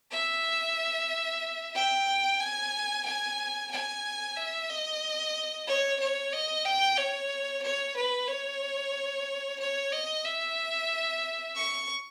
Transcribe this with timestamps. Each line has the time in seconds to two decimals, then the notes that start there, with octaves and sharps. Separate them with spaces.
0.12 E5
1.75 G5
2.41 G#5
3.06 G#5
3.71 G#5
4.37 E5
4.70 D#5
5.67 C#5
6.00 C#5
6.33 D#5
6.65 G5
6.97 C#5
7.63 C#5
7.96 B4
8.28 C#5
9.59 C#5
9.92 D#5
10.24 E5
11.56 C#6